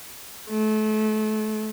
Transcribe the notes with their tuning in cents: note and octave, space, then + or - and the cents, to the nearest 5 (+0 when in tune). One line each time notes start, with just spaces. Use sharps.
A3 -30